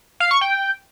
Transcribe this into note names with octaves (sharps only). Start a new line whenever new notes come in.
F5
C#6
G5